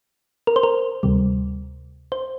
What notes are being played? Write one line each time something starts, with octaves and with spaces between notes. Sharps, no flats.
A#4
C5
A#4
D2 C3 G3
C5